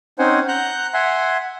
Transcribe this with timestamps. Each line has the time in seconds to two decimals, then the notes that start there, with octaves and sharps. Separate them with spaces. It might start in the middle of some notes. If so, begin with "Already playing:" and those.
0.19 C4 C#4 D#4 C5 F#5 G#5
0.48 F#5 A#5 F#6 G6
0.94 E5 F#5 G#5 C6